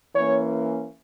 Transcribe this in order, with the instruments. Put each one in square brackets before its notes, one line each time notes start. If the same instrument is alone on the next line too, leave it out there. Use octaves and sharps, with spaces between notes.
[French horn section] E3 A#3 C#4 C#5